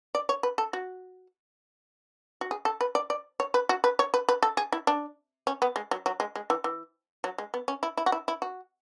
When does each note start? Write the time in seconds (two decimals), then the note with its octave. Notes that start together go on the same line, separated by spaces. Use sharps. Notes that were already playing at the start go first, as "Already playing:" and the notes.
0.15 D5
0.29 C#5
0.43 B4
0.58 A4
0.73 F#4
2.41 F#4
2.51 G#4
2.65 A4
2.81 B4
2.95 D5
3.10 D5
3.40 C#5
3.54 B4
3.69 F#4
3.84 B4
3.99 C#5
4.14 B4
4.29 B4
4.43 A4
4.57 G#4
4.72 E4
4.87 D4
5.47 C#4
5.62 B3
5.76 G#3
5.91 F#3
6.06 F#3
6.20 G#3
6.36 G#3
6.50 E3
6.64 E3
7.24 F#3
7.38 G#3
7.54 B3
7.68 C#4
7.83 E4
7.97 E4
8.06 F#4
8.12 E4
8.28 E4
8.42 F#4